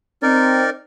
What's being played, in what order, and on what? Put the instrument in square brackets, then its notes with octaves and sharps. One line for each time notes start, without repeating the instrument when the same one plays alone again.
[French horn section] C4 [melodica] D#4 A#4 D5